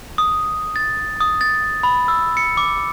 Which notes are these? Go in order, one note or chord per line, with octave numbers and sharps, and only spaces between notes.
D#6
A6
D#6
A6
B5
E6
C#7
D6